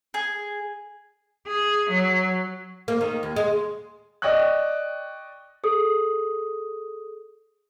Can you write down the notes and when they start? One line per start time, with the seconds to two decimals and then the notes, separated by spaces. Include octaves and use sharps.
0.14 G#4
1.48 G#4
1.90 F#3
2.88 A#3
3.01 D#3
3.23 D#2
3.36 G#3
4.22 D5 D#5 G5 C#6 F#6
5.64 G#4 A4 D#6